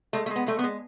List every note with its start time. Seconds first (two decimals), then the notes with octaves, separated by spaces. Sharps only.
0.13 G#3 A3
0.26 A3
0.30 G#3
0.36 B3
0.47 G#3 A3
0.59 B3
0.64 G#3